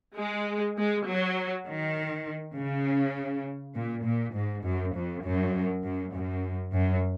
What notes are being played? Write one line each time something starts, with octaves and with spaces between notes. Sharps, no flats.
G#3
G#3
F#3
D#3
C#3
A#2
A#2
G#2
F#2
F2
F#2
F#2
F#2
F#2